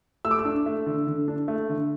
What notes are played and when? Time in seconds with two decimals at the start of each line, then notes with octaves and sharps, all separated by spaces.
0.25 A3 E6
0.31 D6
0.39 E6
0.45 D4
0.66 A3
0.86 D3
1.07 D3
1.28 D4
1.48 A3
1.69 D3